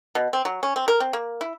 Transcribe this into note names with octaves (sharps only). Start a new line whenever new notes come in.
B2
C4
F#3
C#4
C4
A#4
C4
A#3
E4